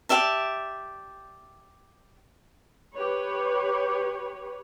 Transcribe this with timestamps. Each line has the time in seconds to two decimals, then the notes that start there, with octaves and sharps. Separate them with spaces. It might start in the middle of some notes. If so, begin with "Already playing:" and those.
0.09 G4 D5 E5 A5
2.95 G4 B4 C#5